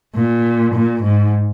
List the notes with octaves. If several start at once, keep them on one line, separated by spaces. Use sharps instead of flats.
A#2
A#2
G#2